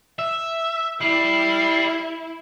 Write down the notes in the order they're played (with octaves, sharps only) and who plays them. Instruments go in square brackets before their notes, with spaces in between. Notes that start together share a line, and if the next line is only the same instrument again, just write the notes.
[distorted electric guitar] E5
[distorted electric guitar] G3 [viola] E4 [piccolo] C7